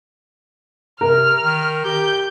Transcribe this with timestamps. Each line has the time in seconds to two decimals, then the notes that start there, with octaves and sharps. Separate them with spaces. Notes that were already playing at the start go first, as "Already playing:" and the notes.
1.01 C3 A#4 F6
1.44 D#3
1.85 G4 G6